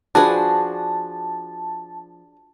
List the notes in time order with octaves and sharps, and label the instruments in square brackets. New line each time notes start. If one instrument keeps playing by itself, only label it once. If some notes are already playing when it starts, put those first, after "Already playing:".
[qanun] F3 F#4 [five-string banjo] D4 G#4 B4 [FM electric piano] A5